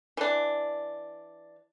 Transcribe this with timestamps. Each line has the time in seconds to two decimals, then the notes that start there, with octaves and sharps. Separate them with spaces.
0.17 E3 D4